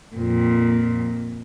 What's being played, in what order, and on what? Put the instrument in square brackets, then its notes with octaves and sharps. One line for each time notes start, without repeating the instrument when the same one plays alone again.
[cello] F2 A#2